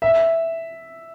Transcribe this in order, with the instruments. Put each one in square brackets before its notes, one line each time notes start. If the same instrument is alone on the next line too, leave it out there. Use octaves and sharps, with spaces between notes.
[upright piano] E5